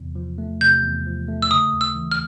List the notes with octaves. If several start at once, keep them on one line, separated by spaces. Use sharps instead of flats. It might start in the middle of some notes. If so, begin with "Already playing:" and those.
Already playing: E2 C3
F3
A3
C3 G6
E2
F3
A3
E6
C#3 D#6
D#2
E6
E3
F6